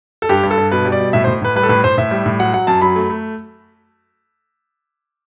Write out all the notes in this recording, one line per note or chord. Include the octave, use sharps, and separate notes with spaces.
A4
G2 G4
G2
A4
G2
B2 B4
G3
D5
B2
A2 E5
C5
A2
A2 B4
G3 B4
A4
A2 B4
A2 C5
A2 E5
G3
A2
F#3 F#5
F#3 F#5
F#2 A5
F#3 B5
A3
A3